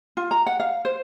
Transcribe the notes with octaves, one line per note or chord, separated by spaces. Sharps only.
F4
A#5
F#5
F5
C5